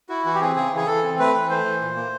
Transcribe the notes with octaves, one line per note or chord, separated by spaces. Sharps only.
E4 F#4
E3 F#4
G4
C4 G#4
C#3 G#4
E3 G#4
E3 A4
C4
A3 B4
E3
A3 C5
E3
A#2
A#3